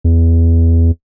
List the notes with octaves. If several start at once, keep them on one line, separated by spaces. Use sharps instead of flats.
E2